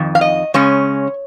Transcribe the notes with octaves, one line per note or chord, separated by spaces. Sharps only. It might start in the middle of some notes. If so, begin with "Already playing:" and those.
Already playing: F2 D#3
F5
D#5
C#3 G#3 C#4 C#5